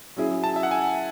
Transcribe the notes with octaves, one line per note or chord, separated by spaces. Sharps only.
F#3 C#4 E4 G#4
A5
E5
F#5
G#5